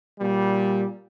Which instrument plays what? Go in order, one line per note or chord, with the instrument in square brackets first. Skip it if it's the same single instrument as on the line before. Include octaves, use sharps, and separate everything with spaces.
[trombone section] A#2 G3